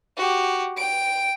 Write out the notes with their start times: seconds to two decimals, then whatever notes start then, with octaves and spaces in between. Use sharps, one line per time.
0.17 F#4 G4
0.77 G5 D7